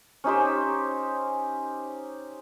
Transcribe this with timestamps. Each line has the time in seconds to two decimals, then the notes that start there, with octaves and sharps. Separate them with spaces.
0.24 C#4 D#4 G4 C5